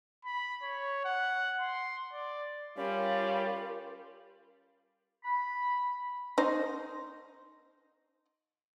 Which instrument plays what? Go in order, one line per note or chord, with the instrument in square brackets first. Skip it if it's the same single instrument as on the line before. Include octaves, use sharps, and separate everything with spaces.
[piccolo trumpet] B5
C#5
F#5
C6
D5
[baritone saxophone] G3 [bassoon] C#4 [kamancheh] F4 [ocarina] A#4
[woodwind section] B5
[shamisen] D#4 C5